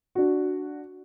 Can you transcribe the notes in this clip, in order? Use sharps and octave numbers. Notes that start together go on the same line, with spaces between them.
D4 F#4